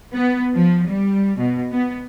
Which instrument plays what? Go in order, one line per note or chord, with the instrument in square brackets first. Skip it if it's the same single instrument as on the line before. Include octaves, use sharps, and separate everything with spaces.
[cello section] B3
F3
G3
B2
B3